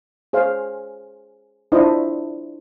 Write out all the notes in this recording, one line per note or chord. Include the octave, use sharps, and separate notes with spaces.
G#4 C5 C#5 F5
D4 E4 F4 C5 D#5